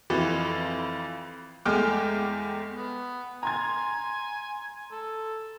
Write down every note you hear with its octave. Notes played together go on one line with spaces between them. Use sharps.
F2 E3 F3
E2 G#3 A3 G5 D6 F6
B3
G#5 A#5 C6 G#6
A4